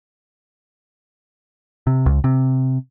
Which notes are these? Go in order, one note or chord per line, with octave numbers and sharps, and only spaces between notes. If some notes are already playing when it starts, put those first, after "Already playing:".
C3
C#2
C3